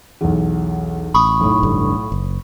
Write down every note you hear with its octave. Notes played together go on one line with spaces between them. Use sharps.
B1 E2
A1 B5 C#6 D#6
B1 A2
F1 G2 D3
F#1